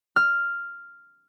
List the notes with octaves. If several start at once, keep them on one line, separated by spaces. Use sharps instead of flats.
F6